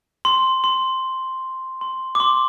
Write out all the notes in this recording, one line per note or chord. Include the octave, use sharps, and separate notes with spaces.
C6
C6
C6
D6
C6